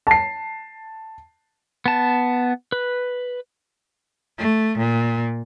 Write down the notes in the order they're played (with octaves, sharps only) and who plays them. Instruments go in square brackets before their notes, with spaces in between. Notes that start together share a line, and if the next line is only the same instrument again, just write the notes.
[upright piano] A5 C7
[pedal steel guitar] B3 A5
B4
[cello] A3
A#2